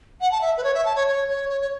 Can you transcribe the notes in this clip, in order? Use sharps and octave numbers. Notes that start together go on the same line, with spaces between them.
F#5
A5
E5
B4
C#5
E5
A5
C#5
C#5
C#5
C#5
C#5